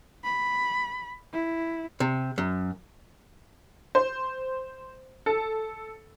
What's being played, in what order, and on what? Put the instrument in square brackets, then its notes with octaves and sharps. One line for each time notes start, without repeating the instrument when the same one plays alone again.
[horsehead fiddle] B5
E4
[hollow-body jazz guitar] C3
F#2
[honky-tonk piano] C5
A4